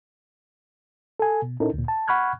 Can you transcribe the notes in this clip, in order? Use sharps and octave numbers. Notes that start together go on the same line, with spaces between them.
A4 G#5
B2
A#2 C#4 D#4 E4 A4 A#4
D2 A#2
A5
F#5 B5 C#6 F6 F#6 G#6